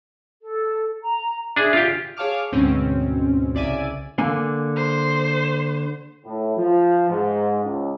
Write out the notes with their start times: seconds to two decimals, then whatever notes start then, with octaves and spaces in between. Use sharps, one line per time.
0.41 A4
1.03 A#5
1.56 D4 G#4 E5
1.73 F4 G4
2.17 G#4 C#5 F5 A5 D6 F6
2.52 D2 G#2 B2 C4 C#4
3.55 C2 C#3 D5 E5 G#5 D#7
4.18 D3 A#3 G#5
4.76 C5
6.25 A2
6.57 F3
7.10 G#2
7.63 C#2